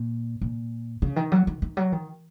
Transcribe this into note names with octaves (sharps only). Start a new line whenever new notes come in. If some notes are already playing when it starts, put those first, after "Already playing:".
Already playing: A#2
A#2
C#3
D#3
F#3
D#3
D#3
F#3
D#3